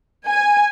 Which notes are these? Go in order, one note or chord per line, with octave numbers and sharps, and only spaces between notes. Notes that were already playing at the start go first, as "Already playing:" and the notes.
G#5